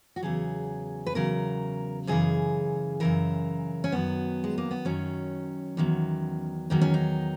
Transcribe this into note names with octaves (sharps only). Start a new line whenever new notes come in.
F#4
E2 C#3 F#3 G#4
B4
E2 C#3 F#3 A#4
F#2 C#3 E3 G#4
F#2 C#3 E3 A#4
C#4
F#2 D#3 F#3 B3
G#3
A#3
B3
F#2 D#3 F#3 C#4
E2 D#3 F#3
E2 D#3 F#3 D#4
C#4
D#4